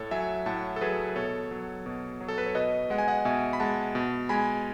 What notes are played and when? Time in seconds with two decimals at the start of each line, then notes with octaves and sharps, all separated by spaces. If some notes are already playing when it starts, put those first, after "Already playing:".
Already playing: A2 A4 C#5
0.11 F#3 E5 G#5
0.46 A2 F#5 A5
0.76 A4
0.81 F#3 G#4 B4
1.09 B4
1.16 B2 A4 C#5
1.51 F#3
1.86 B2
2.21 F#3
2.28 A4
2.38 B4
2.46 C#5
2.55 B2 B4 D#5
2.90 G#3 F#5
2.98 G#5
3.08 D#5 F#5
3.25 B2 E5 G#5
3.53 B5
3.60 G#3 F#5 A5
3.95 B2
4.29 G#3 G#5 B5